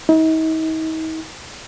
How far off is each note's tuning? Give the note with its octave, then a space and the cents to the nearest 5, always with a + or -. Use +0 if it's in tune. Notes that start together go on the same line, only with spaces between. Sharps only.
D#4 +40